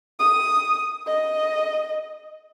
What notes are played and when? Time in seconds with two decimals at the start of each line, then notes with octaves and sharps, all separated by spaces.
0.20 D#6
1.06 D#5